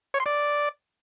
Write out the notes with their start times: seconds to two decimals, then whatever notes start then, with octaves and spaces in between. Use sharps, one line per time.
0.14 C#5
0.20 C6
0.26 D5